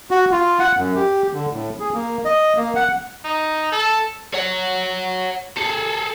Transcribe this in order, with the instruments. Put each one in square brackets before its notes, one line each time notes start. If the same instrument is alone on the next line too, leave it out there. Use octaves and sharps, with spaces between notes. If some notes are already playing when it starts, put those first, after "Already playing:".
[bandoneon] F#4
F4
F#5
F#2
G4
D3
A2
G#4
A#3
D#5
A#3
F#5
[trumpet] D#4
A4
[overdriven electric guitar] C#5 F#5
G#4 A4